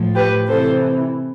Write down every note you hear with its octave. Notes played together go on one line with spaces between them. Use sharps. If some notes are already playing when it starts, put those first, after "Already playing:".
Already playing: A2 F3
G4 B4
C3 E3 A4 C5